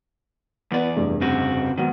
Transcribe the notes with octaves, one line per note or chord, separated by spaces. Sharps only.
E2 B3 B4 D5
F1 G2 G#4
C#3 C4 F#4
G#2 D#3 F#3 B3